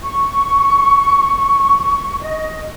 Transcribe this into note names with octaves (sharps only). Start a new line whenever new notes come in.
C#6
D#5